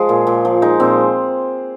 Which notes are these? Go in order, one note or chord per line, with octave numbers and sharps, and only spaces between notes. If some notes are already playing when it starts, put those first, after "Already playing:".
Already playing: F3 G#3 G#4
A#2
A#2
F3
G#3 D#4
A#2 C4